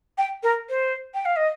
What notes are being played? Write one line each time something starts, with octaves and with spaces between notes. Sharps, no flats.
G5
A#4
C5
G5
F5
D#5